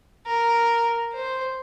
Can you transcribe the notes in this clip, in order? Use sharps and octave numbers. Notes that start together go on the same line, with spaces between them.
A#4
C5